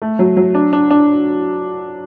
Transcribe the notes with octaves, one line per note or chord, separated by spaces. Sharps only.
A3
F#3
F#3
D4
D4
D4